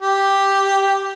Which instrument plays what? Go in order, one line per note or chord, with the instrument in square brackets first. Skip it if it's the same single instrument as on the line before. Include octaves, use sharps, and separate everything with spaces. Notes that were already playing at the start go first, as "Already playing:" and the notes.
[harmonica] G4